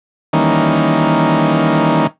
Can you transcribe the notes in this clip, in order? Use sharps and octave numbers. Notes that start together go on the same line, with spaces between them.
D#3 E3 G3 A#3 C#4 D#4